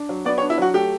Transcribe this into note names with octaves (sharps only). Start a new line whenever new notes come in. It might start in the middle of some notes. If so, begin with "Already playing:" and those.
Already playing: D4
F#3
B3 D5
C#5
D4
E4
F#3 F#4
A3 G4